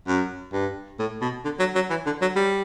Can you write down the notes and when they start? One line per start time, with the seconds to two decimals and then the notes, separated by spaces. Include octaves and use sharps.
0.07 F#2
0.53 G2
0.99 A2
1.21 B2
1.45 D3
1.59 F#3
1.75 F#3
1.90 E3
2.06 D3
2.22 F#3
2.36 G3